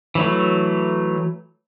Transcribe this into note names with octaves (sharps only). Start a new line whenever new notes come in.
E3 F#3 A3